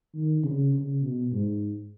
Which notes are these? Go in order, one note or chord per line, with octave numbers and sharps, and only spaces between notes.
D#3
C#3
C#3
B2
G#2